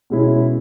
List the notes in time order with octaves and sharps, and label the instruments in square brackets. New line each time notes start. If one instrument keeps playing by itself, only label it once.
[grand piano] B2 G#3 C#4 E4